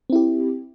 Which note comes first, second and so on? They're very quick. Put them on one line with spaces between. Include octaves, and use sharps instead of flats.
C4 E4 G4